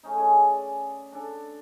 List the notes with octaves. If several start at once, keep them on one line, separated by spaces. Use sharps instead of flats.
A3 C#4 D#4
C#4 G#4 D5 G#5
D4 A4